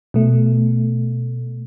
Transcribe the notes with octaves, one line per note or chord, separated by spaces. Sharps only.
B2 A3